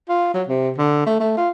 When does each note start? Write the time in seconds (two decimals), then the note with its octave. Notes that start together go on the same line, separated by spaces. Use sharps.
0.09 F4
0.34 F#3
0.49 C3
0.78 D3
1.06 A3
1.20 A3
1.37 F4